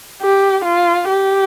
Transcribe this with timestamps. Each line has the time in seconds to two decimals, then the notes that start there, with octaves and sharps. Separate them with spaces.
0.22 G4
0.65 F4
1.09 G4